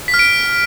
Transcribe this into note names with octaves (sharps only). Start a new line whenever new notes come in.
B6
F6
D7